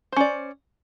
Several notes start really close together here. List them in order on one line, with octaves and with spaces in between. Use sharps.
C5 C#4 D5